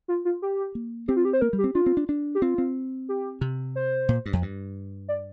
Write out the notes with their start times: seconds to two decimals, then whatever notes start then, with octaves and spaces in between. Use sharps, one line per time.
0.08 F4
0.25 F4
0.42 G4
0.75 A#3
1.08 C4 G4
1.17 F4
1.25 G4
1.33 C5
1.41 A#3 A#4
1.53 G3
1.58 G4
1.64 C4
1.75 D4 F4
1.86 C4
1.97 D4
2.09 D4
2.35 G4
2.42 C4 F4
2.58 C4
3.09 G4
3.41 C3
3.76 C5
4.09 A#2
4.26 G2
4.33 F2
4.42 G2
5.08 D5